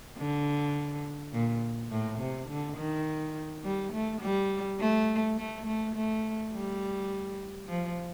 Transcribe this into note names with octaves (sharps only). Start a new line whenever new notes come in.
D3
A#2
A2
C3
D3
D#3
G3
A3
G3
A3
A3
A3
A3
G3
F3